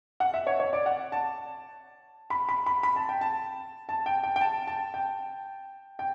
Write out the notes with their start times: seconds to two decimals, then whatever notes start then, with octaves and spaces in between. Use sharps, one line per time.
0.20 F#5
0.34 E5
0.47 C#5
0.60 C#5
0.73 D5
0.86 F#5
1.12 A5
2.30 B5
2.49 B5
2.66 B5
2.83 B5
2.96 A5
3.09 G5
3.21 A5
3.89 A5
4.06 G5
4.23 G5
4.36 G5
4.41 A5
4.67 A5
4.94 G5
5.99 G5